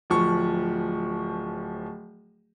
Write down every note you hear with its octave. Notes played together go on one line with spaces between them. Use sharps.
D1 F3 C#6